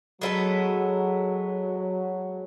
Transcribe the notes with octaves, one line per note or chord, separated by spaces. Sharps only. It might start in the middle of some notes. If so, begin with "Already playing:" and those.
F#3 G#3 B3 E4 A4